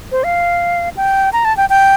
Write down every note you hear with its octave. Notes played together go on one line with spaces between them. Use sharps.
C5
F5
G5
A#5
A5
G5
G5